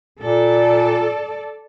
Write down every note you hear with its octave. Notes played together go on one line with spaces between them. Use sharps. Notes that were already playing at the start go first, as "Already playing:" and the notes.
A#2 A4 D5